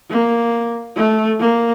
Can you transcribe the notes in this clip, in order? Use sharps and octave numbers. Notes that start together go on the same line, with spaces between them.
A#3
A3
A#3